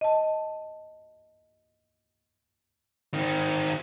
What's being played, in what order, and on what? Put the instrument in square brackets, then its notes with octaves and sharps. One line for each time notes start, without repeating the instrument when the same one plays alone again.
[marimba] D#5 A5
[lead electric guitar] D#3 C4